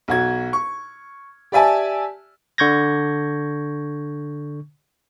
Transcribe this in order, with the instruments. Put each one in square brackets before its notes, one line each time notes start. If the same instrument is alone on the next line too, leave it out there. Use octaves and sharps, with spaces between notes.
[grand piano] B1 F#4 G#6
C#6
G4 D5 E5 G#5 A5
[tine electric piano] D3 C#6 G6 G#6 A#6